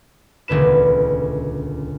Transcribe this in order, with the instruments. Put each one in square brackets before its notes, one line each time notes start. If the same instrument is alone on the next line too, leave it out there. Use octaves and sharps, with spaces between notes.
[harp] D#1 C#2 D3 B4 E7